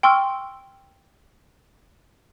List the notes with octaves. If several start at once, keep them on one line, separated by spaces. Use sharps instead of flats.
G5 C6 C#6 E6 F6